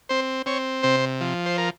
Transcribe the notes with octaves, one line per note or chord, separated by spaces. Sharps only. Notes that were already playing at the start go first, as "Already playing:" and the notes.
C4 C5
C4 C#5
C3 C5
F3
C5
A#4